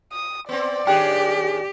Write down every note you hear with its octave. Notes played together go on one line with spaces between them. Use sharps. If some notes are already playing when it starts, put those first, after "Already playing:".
D#6
B3 C4 D5
D#2 D4 G4 G#4 G5